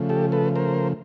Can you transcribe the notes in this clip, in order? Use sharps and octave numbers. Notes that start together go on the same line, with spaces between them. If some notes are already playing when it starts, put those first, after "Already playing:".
Already playing: C#3 F3 A3
G4 A4
A4 B4
A#4 C5